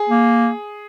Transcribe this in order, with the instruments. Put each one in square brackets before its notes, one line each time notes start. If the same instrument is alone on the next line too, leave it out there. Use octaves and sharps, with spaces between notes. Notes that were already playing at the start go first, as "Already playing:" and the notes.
Already playing: [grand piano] G#4
[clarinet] A#3